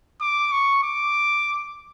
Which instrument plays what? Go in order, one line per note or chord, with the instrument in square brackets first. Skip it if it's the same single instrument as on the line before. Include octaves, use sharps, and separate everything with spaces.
[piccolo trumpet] D6
C#6
D6